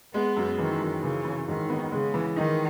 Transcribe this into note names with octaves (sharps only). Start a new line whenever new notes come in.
G#3 B3
F#2
D#3 E3
F#2
C#3 E3
E3
G#2 D#3
B3
C#3 G#3
E3
D#3 D#4